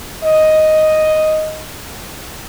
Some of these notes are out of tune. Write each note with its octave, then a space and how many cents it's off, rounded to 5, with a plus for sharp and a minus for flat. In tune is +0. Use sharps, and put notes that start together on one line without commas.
D#5 +0